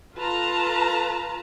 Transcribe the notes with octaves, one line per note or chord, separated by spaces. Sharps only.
F4 A4 B4 A5 A#5